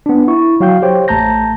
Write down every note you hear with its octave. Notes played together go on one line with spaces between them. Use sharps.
B3 D4
E4 C#6
F#3 F#4 F5 G5 G6
G4 C5 C#5 G5
A1 A3 A5 A#5 G6 A#6